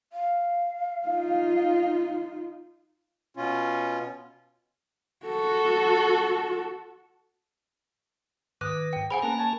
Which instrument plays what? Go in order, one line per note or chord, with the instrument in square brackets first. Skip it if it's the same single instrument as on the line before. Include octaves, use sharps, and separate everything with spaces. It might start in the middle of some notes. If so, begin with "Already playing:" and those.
[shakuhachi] F5
[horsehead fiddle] D#4 F4
[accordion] B2 C#4 F4
[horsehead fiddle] F#4 A4
[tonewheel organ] G#2 D#3 B4 [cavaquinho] D6 D#6 [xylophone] F#6
[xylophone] G5
[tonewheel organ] G#4 C5 [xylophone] F#5 G#5 B5
[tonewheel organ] A#3 C#4 A#4 [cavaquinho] B4 A5 A#5
[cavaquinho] C#5 A5